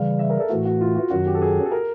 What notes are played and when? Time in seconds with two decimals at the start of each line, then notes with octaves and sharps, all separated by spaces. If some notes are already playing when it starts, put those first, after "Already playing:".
Already playing: C#3 E3 G3 F5
0.19 E5
0.30 A#4
0.40 A4
0.49 A2 E3 A3 F#4
0.65 F#4
0.81 F4
0.95 F#4
1.10 F#2 D#3 F#3 F#4
1.26 G4
1.35 A4
1.42 G#4
1.65 A4
1.72 A#4